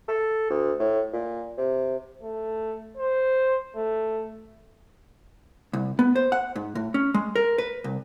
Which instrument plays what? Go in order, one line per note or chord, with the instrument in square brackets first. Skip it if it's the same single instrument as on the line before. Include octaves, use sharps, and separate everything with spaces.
[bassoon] A4
D2
A2
A#2
C3
[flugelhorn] A3
C5
A3
[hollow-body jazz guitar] C2
B3
C5
F#5
G#2
A2
C#4
G#3
A#4
B4
C2